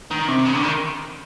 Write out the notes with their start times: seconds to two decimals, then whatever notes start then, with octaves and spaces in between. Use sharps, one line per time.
0.11 D#3
0.28 C3
0.46 C#3
0.54 D3
0.63 D#3